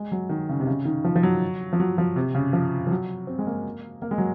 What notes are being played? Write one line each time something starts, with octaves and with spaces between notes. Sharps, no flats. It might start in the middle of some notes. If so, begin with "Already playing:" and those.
Already playing: G#3
F#3
D#3
C#3
C3
C#3
D#3
F3
F3
F#3
F3
F#3
F3
C3
C#3
F3
F3
F#3
C4
G#3
A#3
A#3
G#3
F#3